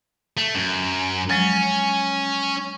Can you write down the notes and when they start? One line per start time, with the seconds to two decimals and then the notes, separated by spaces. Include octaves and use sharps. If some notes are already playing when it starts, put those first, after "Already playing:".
0.37 A3
0.55 F#2
1.30 F3 F#3 G#3 C#4